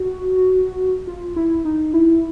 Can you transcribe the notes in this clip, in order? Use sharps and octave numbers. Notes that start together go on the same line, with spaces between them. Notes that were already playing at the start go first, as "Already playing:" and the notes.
Already playing: F#4
F4
E4
D#4
E4